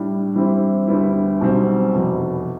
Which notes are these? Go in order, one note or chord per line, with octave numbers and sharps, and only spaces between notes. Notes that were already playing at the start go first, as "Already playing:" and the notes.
Already playing: A2 G3 D4
G2 E3 G3 C4 E4
D2 D3 G3 B3 E4
B1 B2 G3 C4
F1 E2 B2